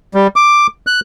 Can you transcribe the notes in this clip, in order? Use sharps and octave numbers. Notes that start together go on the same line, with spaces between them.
G3
D6
F#6